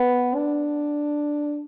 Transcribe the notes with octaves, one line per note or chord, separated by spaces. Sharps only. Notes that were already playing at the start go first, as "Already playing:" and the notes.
Already playing: B3
D4